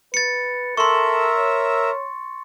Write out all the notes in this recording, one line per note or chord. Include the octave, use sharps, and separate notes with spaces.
B4 A6 C#7
A4 A#4 E5 C6 C#6 E6
C#5